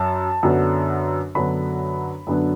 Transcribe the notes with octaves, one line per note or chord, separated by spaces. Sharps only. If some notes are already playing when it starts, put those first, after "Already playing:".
Already playing: F#2 A5
F#2 D3 F#3 B3 D4
F#2 D3 F#3 B3 D4 B5
F#2 D3 F#3 B3 D4